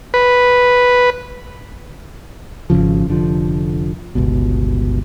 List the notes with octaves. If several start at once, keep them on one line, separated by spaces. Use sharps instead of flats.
B4
G#1 D#2 C#3 F3
F1 D3 F3
G1 C#2 B2